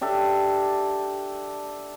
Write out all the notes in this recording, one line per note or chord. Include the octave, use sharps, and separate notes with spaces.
D4 G4 A4 E5